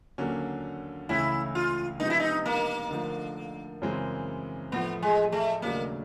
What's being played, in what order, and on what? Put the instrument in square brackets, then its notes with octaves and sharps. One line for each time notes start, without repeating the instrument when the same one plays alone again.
[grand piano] D#2 D3 F#3 A#3 C#4
[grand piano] C#2 C#3 E3 A3 C#4 [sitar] E4
[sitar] F4
[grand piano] C3 F3 G#3 B3 [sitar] D#4
[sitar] E4
D#4
A#3
[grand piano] D3 F3 A3
F#2 C#3 E3 G#3 C4
[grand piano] A2 F3 A3 [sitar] B3
[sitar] G#3
A3
[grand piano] D#2 C#3 F#3 A3 D4 [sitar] A#3